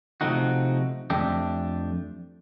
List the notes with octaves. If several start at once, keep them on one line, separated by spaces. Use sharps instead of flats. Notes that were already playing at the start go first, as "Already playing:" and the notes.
C3 F3 A3 D#4 F#4
F2 A3 D4 G4